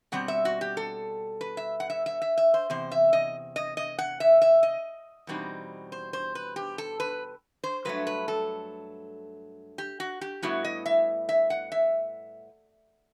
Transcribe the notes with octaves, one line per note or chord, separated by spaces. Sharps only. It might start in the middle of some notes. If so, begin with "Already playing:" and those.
B2 G3 C4 F#5
E5
F#4
G4
A4
B4
E5
F#5
E5
E5
E5
E5
C5
E2 C3 C5
E5
D#5
D#5
D#5
F#5
E5
E5
D#5
E2 B2 G3 C4 D#4
C5
C5
B4
G4
A4
B4
C5
G2 F#3 A3 B4
B4
A4
G4
F#4
G4
A2 G3 B3 E4 F#4
D#5
E5
E5
F#5
E5